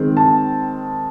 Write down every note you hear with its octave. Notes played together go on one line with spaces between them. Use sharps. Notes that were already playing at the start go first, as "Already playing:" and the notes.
Already playing: D#3 G#3 C4
A5